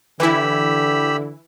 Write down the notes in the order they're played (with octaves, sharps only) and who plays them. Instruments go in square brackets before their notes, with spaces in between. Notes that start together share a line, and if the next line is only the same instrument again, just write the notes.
[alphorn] D3 [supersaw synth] E3 E4 [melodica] G4 B5 E6